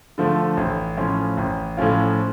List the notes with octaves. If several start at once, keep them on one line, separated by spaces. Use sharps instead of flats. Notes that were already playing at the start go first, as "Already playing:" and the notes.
D3 F3 A3
A1
A2 F3 C#4 F4
A1
A2 F3 C#4 F4